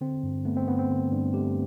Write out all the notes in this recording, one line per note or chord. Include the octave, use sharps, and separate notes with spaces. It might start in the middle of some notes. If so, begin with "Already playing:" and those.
D3 C4
G2
A3 B3
C4
G2 B3
C4
D3
G2
A3 G4